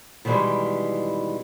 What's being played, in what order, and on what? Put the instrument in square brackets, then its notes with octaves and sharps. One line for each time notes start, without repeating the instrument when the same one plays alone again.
[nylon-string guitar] B2 D#3 E3 G3 G#3